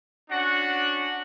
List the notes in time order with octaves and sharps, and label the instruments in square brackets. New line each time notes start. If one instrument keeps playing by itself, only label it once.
[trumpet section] C#4 D4 F#4 F#5